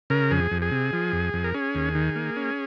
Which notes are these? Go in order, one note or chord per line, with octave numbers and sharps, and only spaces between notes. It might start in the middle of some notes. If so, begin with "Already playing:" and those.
C#3 A#4
F2 G#4
F2
G#4
C3
F3
F2
F2
A#4
C#4 G#4
D#2
D#3
A#3
C#4